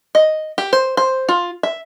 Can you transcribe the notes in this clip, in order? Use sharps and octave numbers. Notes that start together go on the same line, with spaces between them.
D#5
G4
C5
C5
F4
E5